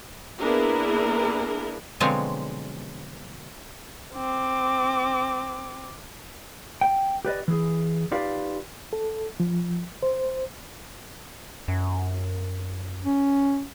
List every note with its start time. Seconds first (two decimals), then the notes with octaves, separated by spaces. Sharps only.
0.40 A#3 B3 D4 E4 G#4 A#4
2.00 B2 D3 F3 F#3 G#3 C4
4.14 C4 D6
6.81 G5
7.25 G4 B4 D5 D#5
7.48 E3 G#4
8.11 D#4 F4 G4 B4 D5 F5
8.93 A4
9.40 F3
10.03 C5
11.68 F#2
13.05 C#4